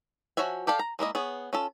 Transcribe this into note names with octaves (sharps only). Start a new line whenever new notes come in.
F3 F#4 C#5 E5 G#5
G4 A4 D5 F5
A#5
G#3 A#3 E4 D#5
B3 G#4 C#5
C#4 F4 A4